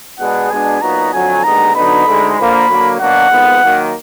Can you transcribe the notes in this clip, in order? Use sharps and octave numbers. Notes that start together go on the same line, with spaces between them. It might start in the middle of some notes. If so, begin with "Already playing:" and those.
B2 G#3 D4 G#4 B4 F#5
B2 G#3 B3 D4 G#5
A#2 F#3 B3 D#4 F#4 A#5
F2 D3 F#3 G#5
D#2 D3 G#3 B3 D#4 A#5
D3 F#3 B3 D#4 B5
D2 D3 G#3 D#4
D3 F3 A#3 B5
D3 F#3 A#3
B2 F#3 A#3 D4 F#4 F#5
F2 D#3 G#3 B3
D#3 F#3 A#3